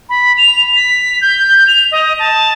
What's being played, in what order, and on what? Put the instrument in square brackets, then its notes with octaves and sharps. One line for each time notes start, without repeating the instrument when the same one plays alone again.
[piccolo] B5
F7
B6
G6
F7
D#5
A5